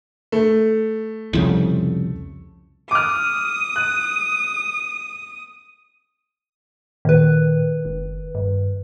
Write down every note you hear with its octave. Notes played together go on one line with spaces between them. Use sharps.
A3
C2 F2 C#3
D6 D#6 F6
F#6
A#2 D#3 B4
F#1
G2